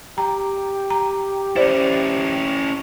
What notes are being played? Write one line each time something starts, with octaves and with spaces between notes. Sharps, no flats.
G4 A#5
A#5
C#4 E4 C5 D5